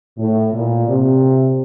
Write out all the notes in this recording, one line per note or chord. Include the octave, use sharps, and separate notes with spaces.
A2
A#2
C3